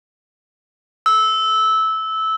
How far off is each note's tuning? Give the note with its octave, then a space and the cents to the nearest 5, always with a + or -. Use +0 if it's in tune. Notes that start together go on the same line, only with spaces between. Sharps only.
E6 -15